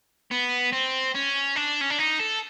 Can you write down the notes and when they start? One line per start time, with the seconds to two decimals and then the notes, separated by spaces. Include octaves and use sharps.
0.31 B3
0.73 C4
1.15 C#4
1.56 D4
1.81 C#4
1.90 D4
1.98 D#4
2.19 A4